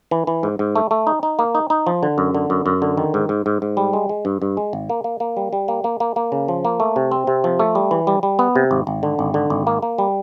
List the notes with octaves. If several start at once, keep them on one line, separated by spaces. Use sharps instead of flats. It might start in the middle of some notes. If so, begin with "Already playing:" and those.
E3
E3
G#2
G#2
A3
A3
D#4
D#4
A#3
D#4
D#4
F3
D3
F#2
D3
F#2
F#2
D3
D#3
G#2
G#2
G#2
G#2
G3
G#3
G#3
G2
G2
G#3
G#1
A#3
A#3
A#3
G3
G3
A#3
A#3
A#3
A#3
C#3
F3
A#3
A3
C3
C4
C3
F3
A3
G3
E3
G3
G3
B3
C3
G#1
G#1
D3
G#1
D3
G#1
A#3
A#3
G3